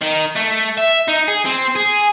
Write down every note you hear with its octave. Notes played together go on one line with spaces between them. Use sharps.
D#3
A3
E5
D#4
G#4
C4
G#4